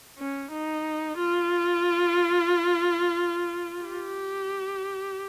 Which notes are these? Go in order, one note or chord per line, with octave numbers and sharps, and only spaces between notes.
C#4
D#4
F4
G4